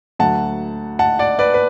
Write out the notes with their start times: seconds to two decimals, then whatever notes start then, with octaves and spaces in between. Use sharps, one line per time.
0.19 D2 D3 F#3 F#5 A5
0.99 F#5 A5
1.19 D5 F#5
1.39 B4 D5
1.54 B4